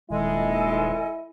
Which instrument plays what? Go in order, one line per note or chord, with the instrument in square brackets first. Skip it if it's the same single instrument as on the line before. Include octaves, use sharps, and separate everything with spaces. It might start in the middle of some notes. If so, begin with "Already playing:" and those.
[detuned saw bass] D#1 [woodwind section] G#3 [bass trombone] E4 [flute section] A4 D#5 G#5